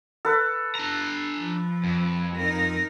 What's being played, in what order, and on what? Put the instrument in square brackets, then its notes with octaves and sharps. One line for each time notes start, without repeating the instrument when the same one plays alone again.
[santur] A4 B4
[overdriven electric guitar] D4 A#5
[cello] F3
[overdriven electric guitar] F2
[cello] D#4 A#4